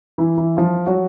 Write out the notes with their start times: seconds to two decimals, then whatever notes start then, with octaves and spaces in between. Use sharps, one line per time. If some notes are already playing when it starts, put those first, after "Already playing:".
0.18 E3 E4
0.37 E3 E4
0.57 F3 F4
0.86 F#3 F#4